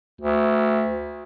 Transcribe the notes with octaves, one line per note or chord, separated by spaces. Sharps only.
D2